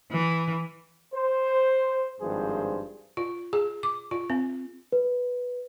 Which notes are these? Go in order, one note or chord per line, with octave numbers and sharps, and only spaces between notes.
E3
C5
G#1 G2 F3 G#4 C5
F4
G#4
D6
F4
C4
B4